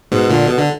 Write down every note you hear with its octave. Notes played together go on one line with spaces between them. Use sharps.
G#2 B2
A#2 D3
B2
D3